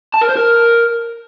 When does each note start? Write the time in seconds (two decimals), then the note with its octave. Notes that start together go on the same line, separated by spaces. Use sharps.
0.14 A5
0.22 A#4
0.29 C5
0.36 A#4